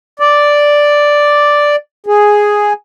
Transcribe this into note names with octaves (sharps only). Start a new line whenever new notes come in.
D5
G#4